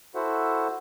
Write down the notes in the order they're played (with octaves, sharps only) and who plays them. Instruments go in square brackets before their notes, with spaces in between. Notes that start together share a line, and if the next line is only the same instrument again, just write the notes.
[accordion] E4 F#4 A4 C5 E5 F#5